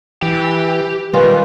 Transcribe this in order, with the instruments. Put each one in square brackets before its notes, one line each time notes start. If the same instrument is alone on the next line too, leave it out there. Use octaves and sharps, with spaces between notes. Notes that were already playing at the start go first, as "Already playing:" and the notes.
[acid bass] E3 [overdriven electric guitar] G4
[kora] D#3 C#4 F4 [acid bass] G3 [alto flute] B4